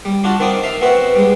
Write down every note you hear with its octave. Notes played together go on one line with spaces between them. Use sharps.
G3
D4 F4 F#4
D#3 C4 D5 D#6
E5 F5
B3 C4 F#4 B4 E5
G3 G#3